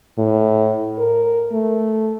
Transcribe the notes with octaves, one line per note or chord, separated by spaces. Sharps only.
A2
A#4
A3